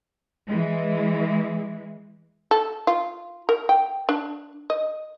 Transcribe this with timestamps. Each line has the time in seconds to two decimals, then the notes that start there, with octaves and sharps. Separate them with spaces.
0.47 E3 G#3
2.51 A4
2.87 F4
3.49 A#4
3.69 G5
4.09 D4
4.70 D#5